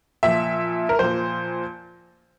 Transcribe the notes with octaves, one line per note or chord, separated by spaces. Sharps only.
A#2 F3 E5
A#4
A#2 F3 C5